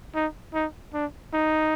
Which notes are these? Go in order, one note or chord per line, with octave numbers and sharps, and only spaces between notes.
D#4
D#4
D4
D#4